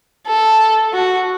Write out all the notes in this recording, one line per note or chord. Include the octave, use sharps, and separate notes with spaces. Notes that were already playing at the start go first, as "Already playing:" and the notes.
A4
F#4